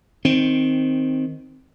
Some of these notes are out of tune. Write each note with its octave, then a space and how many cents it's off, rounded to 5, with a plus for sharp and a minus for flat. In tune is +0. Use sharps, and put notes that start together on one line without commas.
D#3 +5 C4 +0